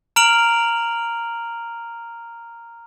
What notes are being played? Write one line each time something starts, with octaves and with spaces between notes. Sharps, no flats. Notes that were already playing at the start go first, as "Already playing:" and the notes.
A#5 F6 D7 F7 F#7